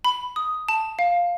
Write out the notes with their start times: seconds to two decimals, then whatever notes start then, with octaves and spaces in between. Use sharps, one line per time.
0.05 B5
0.36 D#6
0.69 A5
0.99 F5